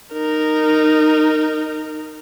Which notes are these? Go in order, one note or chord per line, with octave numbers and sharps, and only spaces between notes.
D#4 A#4